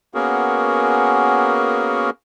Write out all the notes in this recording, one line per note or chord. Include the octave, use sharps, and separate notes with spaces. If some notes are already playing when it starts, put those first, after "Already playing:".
A#3 B3 C#4 F#4 G#4 A#4